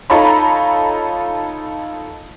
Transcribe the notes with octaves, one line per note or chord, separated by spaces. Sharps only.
D#4 F4 A4 C#5 A#5 B5